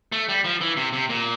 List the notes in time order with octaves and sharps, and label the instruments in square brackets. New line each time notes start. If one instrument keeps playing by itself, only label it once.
[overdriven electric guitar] A3
G3
F3
E3
C3
C3
A#2